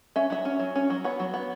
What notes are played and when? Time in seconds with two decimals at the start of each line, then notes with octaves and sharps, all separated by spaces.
0.16 C#4 E5
0.30 F#3 E5
0.45 C#4
0.59 F#3
0.75 C#4
0.90 F#3
1.04 B3 C#5
1.20 F#3
1.34 B3